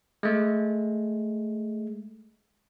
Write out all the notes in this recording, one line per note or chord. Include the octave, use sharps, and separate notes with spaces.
G#3 A3